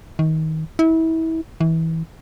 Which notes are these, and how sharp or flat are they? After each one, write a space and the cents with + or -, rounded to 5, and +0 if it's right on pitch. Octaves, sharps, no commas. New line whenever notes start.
D#3 +25
E4 -30
E3 -25